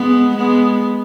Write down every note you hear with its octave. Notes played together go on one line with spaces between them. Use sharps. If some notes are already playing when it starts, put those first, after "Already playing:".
Already playing: G#3 B3
G#3 B3